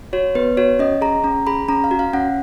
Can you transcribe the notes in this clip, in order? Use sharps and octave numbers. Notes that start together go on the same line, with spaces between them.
F#4 C#5
B3 B4
F#4 C#5
C#4 D#5
G#4 A#5
C#4 A#5
G#4 B5
C#4 A#5
F5
F#4
F5
C#4 F#5